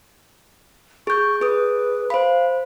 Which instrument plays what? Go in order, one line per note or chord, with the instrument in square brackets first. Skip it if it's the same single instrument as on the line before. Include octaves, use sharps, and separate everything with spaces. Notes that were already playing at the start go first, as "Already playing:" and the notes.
[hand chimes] G#4 G6 [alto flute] C#6
[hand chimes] G#4 D#6 [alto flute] B4
[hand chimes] C5 B5 [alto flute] F5